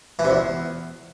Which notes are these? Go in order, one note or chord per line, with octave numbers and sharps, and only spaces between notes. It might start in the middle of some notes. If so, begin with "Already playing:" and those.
E3
C3
E2